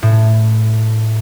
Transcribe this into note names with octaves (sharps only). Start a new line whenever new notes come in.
A2